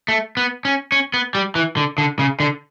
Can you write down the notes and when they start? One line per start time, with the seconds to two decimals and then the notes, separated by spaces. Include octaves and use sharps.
0.08 A3
0.37 B3
0.65 C#4
0.92 C#4
1.14 B3
1.35 G3
1.55 E3
1.77 D3
1.98 D3
2.19 C#3
2.40 D3